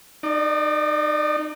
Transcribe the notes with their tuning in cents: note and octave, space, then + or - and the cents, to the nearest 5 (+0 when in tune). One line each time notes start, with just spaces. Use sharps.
D#4 -25 D5 +20